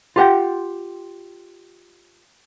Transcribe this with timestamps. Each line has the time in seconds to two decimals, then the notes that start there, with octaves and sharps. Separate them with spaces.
0.16 F4 G4 F#5 G5